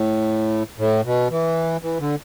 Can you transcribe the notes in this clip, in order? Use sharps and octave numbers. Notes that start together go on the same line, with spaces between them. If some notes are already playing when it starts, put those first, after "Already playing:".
Already playing: A2
A2
B2
E3
E3
D3